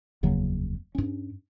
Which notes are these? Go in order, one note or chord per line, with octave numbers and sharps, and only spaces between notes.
F1 D#2 C#3 F#3
G2 C#4